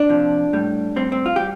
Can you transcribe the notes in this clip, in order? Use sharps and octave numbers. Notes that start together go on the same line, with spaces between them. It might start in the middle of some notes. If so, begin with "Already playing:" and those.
Already playing: D4
C3 F3
A2 G3
A2 G3 C4
C4
F4
G3 G4